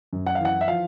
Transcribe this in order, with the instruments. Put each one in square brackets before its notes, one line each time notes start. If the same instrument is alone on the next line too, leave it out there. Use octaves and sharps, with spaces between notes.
[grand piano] F#2
F#5
F5
E3 F#5
E5
F3 F5